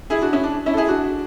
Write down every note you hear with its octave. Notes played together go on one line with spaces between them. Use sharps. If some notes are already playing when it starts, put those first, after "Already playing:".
E4 G#4
D4 F#4
C#4 E4
D4
C#4 E4
A4
E4 G#4
D4 F#4